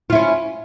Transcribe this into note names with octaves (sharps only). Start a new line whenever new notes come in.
C#4 E4 F4